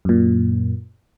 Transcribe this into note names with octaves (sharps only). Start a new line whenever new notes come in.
F#2 A#2